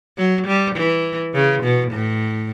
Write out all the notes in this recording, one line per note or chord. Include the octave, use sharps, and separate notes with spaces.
F#3
G3
E3
C#3
B2
A2